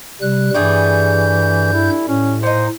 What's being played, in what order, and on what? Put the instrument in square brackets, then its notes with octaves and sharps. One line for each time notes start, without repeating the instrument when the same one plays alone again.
[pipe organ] C3 G3 F#6
[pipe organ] G2 G6 [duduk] E3 [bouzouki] G3 A3 G#4
[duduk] E4
[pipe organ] A2 [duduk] C#4
[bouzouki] A#2 D#4 [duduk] C5